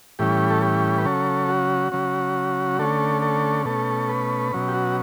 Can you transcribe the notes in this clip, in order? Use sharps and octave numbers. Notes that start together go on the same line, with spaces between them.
A2 E3 G3 C#4 G4
A4
G4
B4
C#3 F#3 C#4 A4
F#4
C#3 F#3 C#4
D3 A3 C#4 A4
A4
B2 A3 C#4 A4
B4
B2 F#3 C#4
G4
F#4